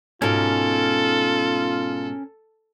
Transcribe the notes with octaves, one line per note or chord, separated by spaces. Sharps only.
G#2 B2 C#4 F4 A4 A#4